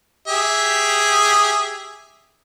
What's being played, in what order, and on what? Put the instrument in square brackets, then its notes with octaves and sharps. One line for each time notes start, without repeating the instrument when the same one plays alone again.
[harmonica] G4 G#4 E5